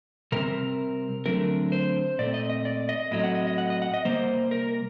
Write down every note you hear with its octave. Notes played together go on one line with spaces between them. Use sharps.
C3 G3 C4 A#4
D3 F#3 A3 C4 A#4
C5
A#2 A3 C4 D5
D#5
D#5
D5
D#5
A2 F#3 A3 C4 D#5
F#5
D#5
D#5
F#5
D#5
F#5
D#5
C3 G3 A#3 C5
A#4